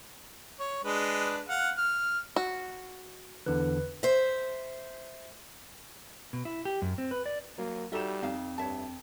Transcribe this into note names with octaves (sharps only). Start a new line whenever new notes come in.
C#5
G#3 D4 B4
F5 F#5
F6
F#4
E2 D3 E3 B4
C5 E5
B2
E4
G4
F#2
C4
B4
D5
F#3 A#3
G3 D#4 F#4 A4 E5 G6 E7
F2 D#4 F5
G2 C#5 E5 A5